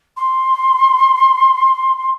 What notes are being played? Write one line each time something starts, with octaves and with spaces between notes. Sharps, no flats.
C6